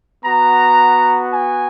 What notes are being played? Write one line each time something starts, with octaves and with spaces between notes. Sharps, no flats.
B3 F#4 A#5
G#5